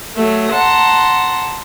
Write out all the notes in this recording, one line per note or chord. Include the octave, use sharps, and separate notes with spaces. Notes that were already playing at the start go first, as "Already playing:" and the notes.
F#3 A3
F#5 A5 A#5 C6